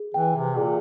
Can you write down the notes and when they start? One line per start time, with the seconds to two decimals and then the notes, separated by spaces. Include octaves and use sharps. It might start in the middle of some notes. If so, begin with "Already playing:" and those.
Already playing: G#4
0.14 E3 G5
0.36 C3
0.58 A#2 G#4